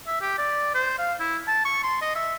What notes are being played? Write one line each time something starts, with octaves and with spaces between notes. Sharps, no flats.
E5
G4
D5
C5
F5
E4
A5
C#6
C6
D#5
E5